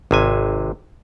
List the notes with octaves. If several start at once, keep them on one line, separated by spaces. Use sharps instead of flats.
G#1 C3 G#5